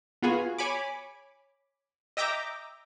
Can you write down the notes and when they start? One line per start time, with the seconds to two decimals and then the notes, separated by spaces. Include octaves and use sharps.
0.22 B3 F4 F#4 G#4
0.58 C#5 G#5 B5 D6
2.17 D#5 E5 G5 A#5 D6